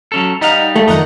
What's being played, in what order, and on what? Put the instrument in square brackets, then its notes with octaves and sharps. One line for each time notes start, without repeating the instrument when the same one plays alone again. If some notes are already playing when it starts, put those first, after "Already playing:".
[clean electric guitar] F#3 C#4 A4
[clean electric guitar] G3 F5 [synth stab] D#4 D#5 F#5
[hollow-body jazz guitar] A3
[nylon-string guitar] D#3 F3 A#3 [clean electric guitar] D#4 [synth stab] F#5 A#5